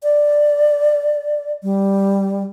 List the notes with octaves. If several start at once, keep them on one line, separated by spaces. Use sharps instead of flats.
D5
G3